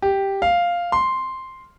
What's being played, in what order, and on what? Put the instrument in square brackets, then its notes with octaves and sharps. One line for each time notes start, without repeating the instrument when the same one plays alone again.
[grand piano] G4
F5
C6